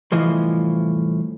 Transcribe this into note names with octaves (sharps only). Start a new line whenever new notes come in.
C2 A2 E3 F3 D#5